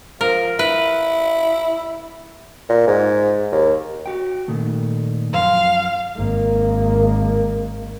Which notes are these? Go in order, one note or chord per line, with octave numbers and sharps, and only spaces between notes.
F3 A#4
E4 B4
A#2
G#2
D#2
F#4 G5
A#2 D#3 A3
F#2 F3 F5 C6
G#1 A#3